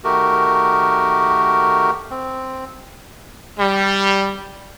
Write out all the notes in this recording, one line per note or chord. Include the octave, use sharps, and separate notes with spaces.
D#3 A3 F#4 G4 A#4
C4
G3